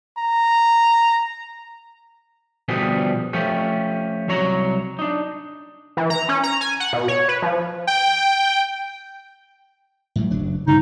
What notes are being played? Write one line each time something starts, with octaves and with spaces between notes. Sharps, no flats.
A#5
B2 D3 F3 G3 B3 G#4
F3 A3 C#4 F4 G4
C2 F#3 C#5 A#5
D4 D#4
E3
A#5
C#4
A#5
G#5
F#5
B2
C#5
B4
F3
G5
A2 F#3 G3
F#1 F#3 D4
G2 C#3 D#4